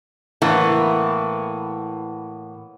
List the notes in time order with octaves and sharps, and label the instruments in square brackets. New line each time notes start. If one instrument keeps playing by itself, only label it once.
[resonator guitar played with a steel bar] A2 E3 A#3 B3